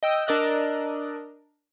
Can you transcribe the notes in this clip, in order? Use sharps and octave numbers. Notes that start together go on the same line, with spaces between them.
D#5 G5 E6
D4 A#4 D5 D#5 E6 F#6